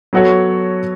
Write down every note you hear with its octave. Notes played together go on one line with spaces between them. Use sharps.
F#3 B3 F#4 A4 C#5